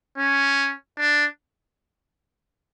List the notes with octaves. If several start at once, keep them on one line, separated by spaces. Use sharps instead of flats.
C#4
D4